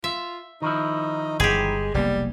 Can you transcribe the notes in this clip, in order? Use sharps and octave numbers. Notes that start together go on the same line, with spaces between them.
F4 E5
D#3 F3 D#4 E4
G1 G#3 G4 G#4
F1 B1 G3 A#3